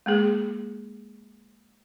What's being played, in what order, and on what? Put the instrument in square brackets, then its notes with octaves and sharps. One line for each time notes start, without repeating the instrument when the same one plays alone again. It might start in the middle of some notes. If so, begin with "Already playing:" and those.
[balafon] G#3 A#3 G#4